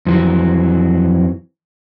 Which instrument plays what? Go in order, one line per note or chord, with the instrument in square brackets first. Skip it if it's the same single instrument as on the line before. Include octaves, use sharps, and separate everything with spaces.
[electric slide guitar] F2 E3 F#3